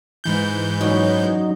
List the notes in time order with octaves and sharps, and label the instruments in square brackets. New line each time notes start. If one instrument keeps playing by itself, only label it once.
[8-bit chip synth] G#2 E3 G6
[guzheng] F#2 G3 C#4 [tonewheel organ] F#3 D#4